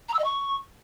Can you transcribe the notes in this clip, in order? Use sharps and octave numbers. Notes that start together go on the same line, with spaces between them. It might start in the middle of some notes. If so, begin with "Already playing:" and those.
A#5
E6
D#5
C#6